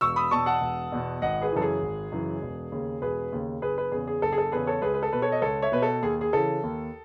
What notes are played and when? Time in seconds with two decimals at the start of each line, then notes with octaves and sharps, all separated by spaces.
0.01 E1 C#6 E6
0.16 B5 D#6
0.31 E2 B2 A5 C#6
0.46 F#5 A5
0.61 E1
0.92 E2 B2
1.22 G#1 D#5 F#5
1.42 G#4 B4
1.52 F#2 C#3 E3 A4
1.62 G#4
1.82 G#1
2.12 F#2 C#3 E3
2.42 E1
2.72 D#2 C#3
3.02 E1 G#4 B4
3.32 D#2 C#3
3.62 F#1 G#4 B4
3.77 G#4 B4
3.92 E2 G#4
3.97 C#3
4.07 G#4
4.22 F#1 A4
4.32 G#4
4.38 A4
4.52 E2 C#3 G#4 B4
4.67 A4 C#5
4.82 C#2 G#4 B4
4.94 B4
5.02 A4
5.13 B2 B4
5.22 A4 C#5
5.32 D#5
5.42 C#2 A4 C#5
5.62 C#5 E5
5.72 B2 B4
5.82 A4
6.02 D#2 G#4
6.21 G#4
6.33 C#3 E3 A4
6.63 D#2